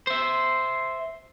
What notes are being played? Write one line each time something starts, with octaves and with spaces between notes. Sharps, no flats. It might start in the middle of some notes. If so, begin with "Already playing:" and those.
C5 E5